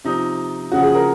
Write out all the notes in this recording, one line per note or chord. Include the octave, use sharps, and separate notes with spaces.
C3 F3 D#4
C#3 F3 F#4
G#4
A#4